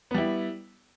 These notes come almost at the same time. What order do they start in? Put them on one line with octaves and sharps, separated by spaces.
B3 G3 E4